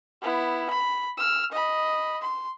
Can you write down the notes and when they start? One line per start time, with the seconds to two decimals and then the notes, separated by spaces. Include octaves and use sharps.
0.22 B3 E4
0.70 B5
1.17 E6 F6
1.51 D#5 B5
2.21 C6